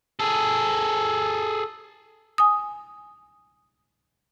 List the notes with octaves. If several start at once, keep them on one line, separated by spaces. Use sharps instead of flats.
G#4 A4
G#5 D#6